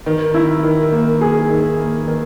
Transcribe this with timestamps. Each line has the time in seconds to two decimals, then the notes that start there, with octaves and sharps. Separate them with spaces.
0.06 D#3
0.34 E4
0.64 D#3
0.92 A#3
1.21 G#4
1.50 D#3
1.79 A#3
2.07 D#3